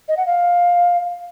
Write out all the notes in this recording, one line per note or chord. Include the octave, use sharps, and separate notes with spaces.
D#5
F#5
F5